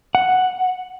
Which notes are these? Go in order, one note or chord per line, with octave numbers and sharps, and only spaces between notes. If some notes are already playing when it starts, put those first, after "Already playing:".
F#5